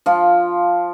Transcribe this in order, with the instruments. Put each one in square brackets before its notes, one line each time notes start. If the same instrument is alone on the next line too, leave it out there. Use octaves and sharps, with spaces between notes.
[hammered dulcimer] F3 F4